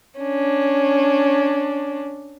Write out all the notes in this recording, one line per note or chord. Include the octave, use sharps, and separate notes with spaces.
C#4 D4